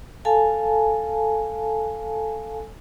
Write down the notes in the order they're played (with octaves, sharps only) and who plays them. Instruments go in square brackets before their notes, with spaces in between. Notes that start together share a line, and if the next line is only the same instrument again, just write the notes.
[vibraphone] A4 F5 G#5 A5